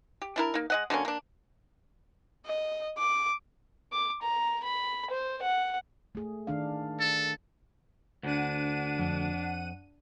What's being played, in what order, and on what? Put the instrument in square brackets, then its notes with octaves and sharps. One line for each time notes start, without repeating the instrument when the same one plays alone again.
[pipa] G4
D4 E4 A#4
A#3 D#4
G#3 D#5 F#5
D3 F#3 A#3 C#4
A#3 D4
[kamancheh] D#5
D6
[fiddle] D6
A#5
B5
C5
F#5
[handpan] A3 G#4
D#3 D4 F5
[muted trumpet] A4
[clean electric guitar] D2 [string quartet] D4 [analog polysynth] F#5 D#7
[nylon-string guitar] F2